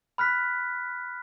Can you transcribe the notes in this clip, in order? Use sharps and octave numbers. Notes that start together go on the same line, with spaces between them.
B5 F6 F#6 B6